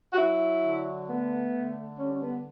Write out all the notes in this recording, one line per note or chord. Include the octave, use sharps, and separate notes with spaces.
F#4
F#3 E4
D3
A3 B3
D3
G3 C#4
C#4
B3